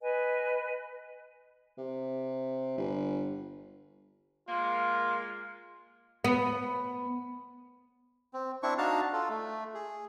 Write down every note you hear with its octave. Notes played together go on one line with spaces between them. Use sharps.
B4 D#5 G#5
C3
G1
G#3 A#3 F4
B3
C4
C4 D4 E4 C#6
D4 D#4 F#4 F5 A5
F4 A4
A3
G#4